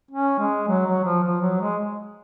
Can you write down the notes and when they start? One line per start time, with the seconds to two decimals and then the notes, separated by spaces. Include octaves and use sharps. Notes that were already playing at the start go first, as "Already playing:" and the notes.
0.11 C#4
0.39 G#3
0.67 F#3
0.86 F#3
1.04 F3
1.23 F3
1.41 F#3
1.61 G#3